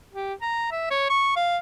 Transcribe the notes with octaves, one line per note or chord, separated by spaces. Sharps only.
G4
A#5
E5
C#5
C#6
F5